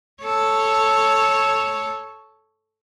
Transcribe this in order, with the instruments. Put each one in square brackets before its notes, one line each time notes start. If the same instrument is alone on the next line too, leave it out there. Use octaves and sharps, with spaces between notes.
[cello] A4 C#5